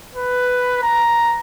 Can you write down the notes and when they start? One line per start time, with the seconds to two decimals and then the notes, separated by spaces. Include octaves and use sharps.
0.15 B4
0.83 A#5